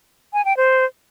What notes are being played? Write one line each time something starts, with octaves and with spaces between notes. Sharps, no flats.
G#5
G5
C5